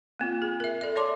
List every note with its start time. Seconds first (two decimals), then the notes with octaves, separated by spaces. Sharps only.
0.19 A#3 C4 F4
0.42 G#4
0.60 A#4 E5
0.81 A4 D5 E5
0.95 C#5 D5 E5 A5 C6 D6